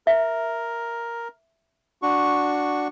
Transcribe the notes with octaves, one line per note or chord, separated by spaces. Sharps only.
A#4 E5
D4 F#4 C#6